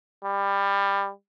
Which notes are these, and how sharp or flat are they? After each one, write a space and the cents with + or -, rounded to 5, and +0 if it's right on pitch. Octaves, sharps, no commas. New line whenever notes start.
G3 +20